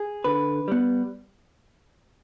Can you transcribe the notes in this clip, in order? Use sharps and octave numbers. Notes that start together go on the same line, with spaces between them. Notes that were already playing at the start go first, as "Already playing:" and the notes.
Already playing: G#4
D3 B4
G3 B3